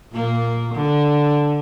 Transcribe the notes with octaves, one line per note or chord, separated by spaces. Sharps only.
A#2 A#3
D3